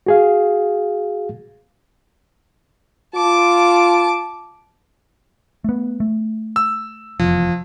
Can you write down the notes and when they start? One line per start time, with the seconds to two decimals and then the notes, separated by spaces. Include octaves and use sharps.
0.06 F#4 G#4 F5
3.15 F4 A5 D6
5.64 A3 B3
6.00 A3
6.56 E6
7.20 F1 E2 F3